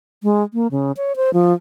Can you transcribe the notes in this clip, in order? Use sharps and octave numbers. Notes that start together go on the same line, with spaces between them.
G#3
A#3
C#3
C#5
C5
F3